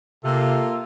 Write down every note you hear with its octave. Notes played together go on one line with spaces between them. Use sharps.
C3 A#3 F4 A4